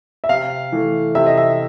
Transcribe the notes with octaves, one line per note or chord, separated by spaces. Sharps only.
E5
C3 F5
E3 A3
C3 E5
D#5
E5